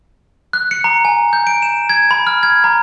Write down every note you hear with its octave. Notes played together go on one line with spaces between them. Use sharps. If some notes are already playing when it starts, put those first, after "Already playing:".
F#6
C#7
A#5
G#5
G6
D7
E7
G#6
B5
F6
G#6
A#5